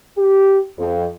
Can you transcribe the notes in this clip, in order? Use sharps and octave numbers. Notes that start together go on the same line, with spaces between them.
G4
F2